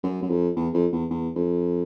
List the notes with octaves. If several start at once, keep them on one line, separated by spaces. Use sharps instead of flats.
F#2
F#2
F2
E2
F2
E2
E2
F2